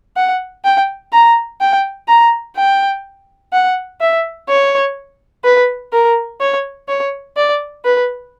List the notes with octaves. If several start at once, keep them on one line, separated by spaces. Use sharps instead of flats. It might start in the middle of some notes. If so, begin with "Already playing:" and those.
F#5
G5
A#5
G5
A#5
G5
F#5
E5
C#5
B4
A#4
C#5
C#5
D5
B4